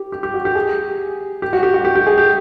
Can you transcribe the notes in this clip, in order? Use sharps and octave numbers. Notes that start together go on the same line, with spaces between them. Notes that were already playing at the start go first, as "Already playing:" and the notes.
Already playing: G4
G4
G4
F#4
G4
G#4
G4
F#4
G4
F#4
G4
G4
G#4
G4